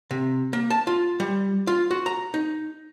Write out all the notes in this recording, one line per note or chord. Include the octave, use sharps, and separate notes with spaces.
C3
A#3
A5
F4
G3
F4
F#4
A#5
D#4